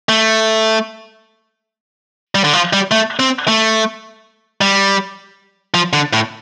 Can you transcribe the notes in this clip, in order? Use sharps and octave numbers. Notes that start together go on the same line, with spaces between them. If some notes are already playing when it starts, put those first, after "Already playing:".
A3
G3
D3
F3
G3
A3
C4
A3
G3
F3
D3
A2